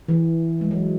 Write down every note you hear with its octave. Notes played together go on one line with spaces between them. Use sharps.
E3
G#3
F#3